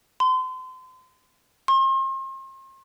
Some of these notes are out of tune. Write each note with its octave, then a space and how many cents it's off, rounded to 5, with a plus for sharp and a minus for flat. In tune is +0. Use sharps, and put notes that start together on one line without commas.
C6 -35
C6 +40